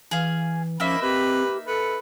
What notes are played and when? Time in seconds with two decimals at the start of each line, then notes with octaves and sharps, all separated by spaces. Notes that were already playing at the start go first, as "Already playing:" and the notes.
0.11 E3 G#4 F5
0.80 F3 A#3 C#4 D#4 E5 B5
1.02 C4 G4 B4
1.67 A4 B4 C#7